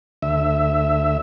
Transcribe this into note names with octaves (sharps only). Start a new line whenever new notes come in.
D2 E5